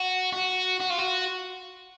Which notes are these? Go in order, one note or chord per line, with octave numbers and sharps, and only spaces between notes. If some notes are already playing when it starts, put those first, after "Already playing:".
Already playing: F#4
F#4
F#4
F4
F#4